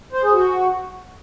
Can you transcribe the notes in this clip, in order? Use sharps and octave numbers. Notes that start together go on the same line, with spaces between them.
C5
G#4
F#4